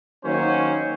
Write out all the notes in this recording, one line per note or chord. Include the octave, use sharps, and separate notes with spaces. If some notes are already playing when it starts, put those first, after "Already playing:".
D#3 F#3 A#3 C#4 C5